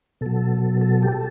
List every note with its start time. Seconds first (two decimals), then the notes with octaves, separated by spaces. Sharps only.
0.21 B2 F#3 A4
0.81 A4
1.03 G4
1.12 A4